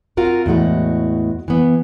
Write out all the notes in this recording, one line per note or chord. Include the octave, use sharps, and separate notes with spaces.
C4 F4 F#4 A#4
E2 A2 G#3 F#4
E3 B3